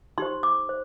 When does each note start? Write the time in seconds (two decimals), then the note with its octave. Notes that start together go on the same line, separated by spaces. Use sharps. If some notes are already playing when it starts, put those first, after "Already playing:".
0.18 D#4 G4 C5 C6
0.43 D6
0.69 C5